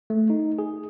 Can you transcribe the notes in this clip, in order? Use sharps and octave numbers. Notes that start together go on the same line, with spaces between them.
A3
D#4
G#4